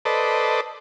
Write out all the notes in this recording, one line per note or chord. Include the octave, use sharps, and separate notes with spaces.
A4 B4 C5 D5 D#5